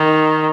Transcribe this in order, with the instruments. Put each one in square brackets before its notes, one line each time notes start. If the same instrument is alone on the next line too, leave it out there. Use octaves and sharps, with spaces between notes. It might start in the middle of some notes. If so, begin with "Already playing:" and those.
Already playing: [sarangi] D#3